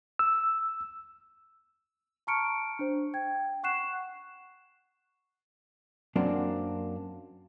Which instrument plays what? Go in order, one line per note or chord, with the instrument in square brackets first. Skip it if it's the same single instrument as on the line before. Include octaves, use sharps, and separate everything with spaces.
[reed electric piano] E6
[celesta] A5 A#5 C#6 F6 C#7 D7
D4 C5
G5 G#6
F#5 C#6 F#6 C7 E7
[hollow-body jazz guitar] F#2 F#3 A#3 C4 D4